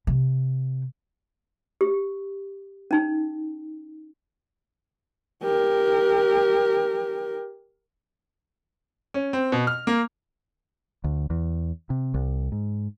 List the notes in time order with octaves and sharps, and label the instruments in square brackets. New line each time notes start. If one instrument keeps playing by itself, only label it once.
[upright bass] C3
[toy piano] G4
C#4 D#4
[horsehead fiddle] G4 A#4
[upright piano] C#4
C4
B2
F6
A#3
[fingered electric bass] D2
E2
C3
C2
G#2